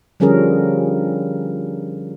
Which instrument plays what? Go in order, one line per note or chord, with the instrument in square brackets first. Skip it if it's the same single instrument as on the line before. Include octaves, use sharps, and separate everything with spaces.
[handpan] D3 F3 G3 C#4 G#4 A#4